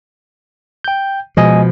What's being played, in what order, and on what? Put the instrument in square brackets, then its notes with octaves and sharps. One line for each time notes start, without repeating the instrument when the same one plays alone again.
[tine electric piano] G5 G6
[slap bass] B2 F3 [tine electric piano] G#3 D#5 G#5